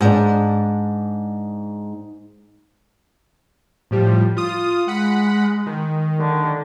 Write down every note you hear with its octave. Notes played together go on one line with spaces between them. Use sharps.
G#2 D4
A2 F3 G3
F4 D#6
G#3 F#5 B5
D#3
D3